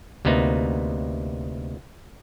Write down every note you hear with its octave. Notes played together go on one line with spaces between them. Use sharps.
D2 C3 A#3 B3 D#4